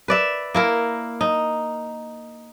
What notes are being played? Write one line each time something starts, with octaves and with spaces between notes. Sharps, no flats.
B4 D5 E5
A#3 E4 A#4
D#4